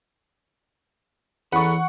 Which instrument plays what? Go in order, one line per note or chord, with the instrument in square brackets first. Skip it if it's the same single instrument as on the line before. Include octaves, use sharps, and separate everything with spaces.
[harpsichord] E2 [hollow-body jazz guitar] A4 B4 [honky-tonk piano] F#5 C#6